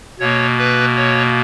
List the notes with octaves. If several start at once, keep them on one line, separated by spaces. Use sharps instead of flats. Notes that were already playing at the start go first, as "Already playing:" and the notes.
B2 A#3 C#5
B4
C#5